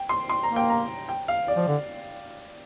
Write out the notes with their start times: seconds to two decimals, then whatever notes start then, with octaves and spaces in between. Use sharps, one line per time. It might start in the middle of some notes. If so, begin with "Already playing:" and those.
Already playing: G5
0.09 C6
0.29 C6
0.43 A#5
0.49 A#3
0.56 G5
0.69 A#5
1.09 G5
1.28 F5
1.48 D5
1.56 F3
1.68 D3